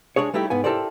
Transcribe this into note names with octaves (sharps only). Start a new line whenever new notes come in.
G#3 D4 G#4 C#5
G3 A3 D#4 E4 G4
G#2 B3 G#5
E4 G4 A4 A#4 C5 D5